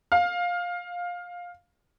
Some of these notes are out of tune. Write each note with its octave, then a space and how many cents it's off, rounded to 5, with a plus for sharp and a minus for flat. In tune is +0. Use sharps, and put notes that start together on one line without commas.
F5 +15